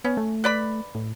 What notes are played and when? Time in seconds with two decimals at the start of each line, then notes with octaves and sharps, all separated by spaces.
0.05 B3 C#4
0.17 A3
0.44 B4 D5 B5
0.95 A2